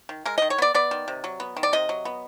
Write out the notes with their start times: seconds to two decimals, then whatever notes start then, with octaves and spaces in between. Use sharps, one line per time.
0.09 D#3
0.25 G#3 A#4
0.38 D#3 D#5
0.50 C#5
0.58 B3 D5
0.74 B3 D5
0.91 D#3
1.08 C3
1.24 F#3
1.40 B3
1.57 D#3
1.63 D5
1.73 C3 D#5
1.89 F#3
2.05 B3